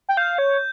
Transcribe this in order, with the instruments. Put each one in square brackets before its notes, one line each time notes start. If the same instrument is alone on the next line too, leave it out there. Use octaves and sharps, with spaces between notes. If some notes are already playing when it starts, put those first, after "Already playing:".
[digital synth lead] G5
[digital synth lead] F5 [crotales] G6
[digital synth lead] C#5